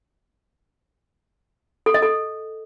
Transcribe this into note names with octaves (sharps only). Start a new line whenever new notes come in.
A4
D#5
A4